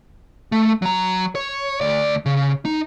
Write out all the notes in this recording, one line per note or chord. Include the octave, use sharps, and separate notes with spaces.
A3
F#3 A#5
C#5
D2 D5
C#3
D#4